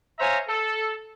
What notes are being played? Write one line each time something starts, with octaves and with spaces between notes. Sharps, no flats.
C5 C#5 E5 F5 G#5 A#5
A4